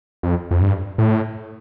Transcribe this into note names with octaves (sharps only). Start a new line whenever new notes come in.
F2
F2
G2
A2